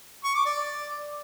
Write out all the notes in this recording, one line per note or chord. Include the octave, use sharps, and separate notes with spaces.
C#6
D6
D5